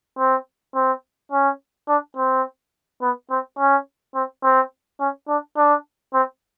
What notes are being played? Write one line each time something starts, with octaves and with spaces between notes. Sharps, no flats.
C4
C4
C#4
D4
C4
B3
C4
C#4
C4
C4
C#4
D4
D4
C4